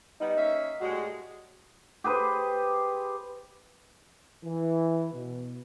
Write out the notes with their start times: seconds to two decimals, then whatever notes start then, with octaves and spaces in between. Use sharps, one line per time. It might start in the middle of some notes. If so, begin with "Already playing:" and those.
0.20 G3 B3 D#4
0.36 A#3 C#4 E5
0.81 A2 G3 G#3 F#4
2.04 G4 G#4 B4 C5
4.44 E3
5.13 B2